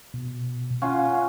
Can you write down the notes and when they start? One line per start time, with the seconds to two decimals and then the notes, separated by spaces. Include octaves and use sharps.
0.14 B2
0.82 C#4 F4 F5 F#5